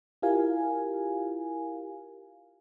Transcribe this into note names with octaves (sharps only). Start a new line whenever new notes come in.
E4 F4 G4 A#4 F5 G#5